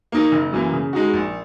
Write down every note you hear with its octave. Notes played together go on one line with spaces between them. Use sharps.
A#3 D#4 A#4
F#1
F#2 E3 A#3
C#3
G#3 D#4 F#4
A#1